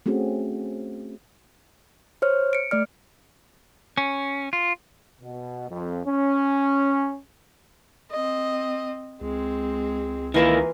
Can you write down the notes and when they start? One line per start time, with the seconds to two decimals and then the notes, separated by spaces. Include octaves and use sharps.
0.06 A3 C4 C#4 F#4 G#4
2.22 C5 C#5 F6
2.53 C#7 D7
2.71 A3 D5 F6
3.98 C#4
4.53 F4
5.22 B2
5.70 F2
6.05 C#4
8.12 C4 D#5
9.21 C#2 G#3 C4
10.34 D#3 E3 A#3 E4 F4 A#4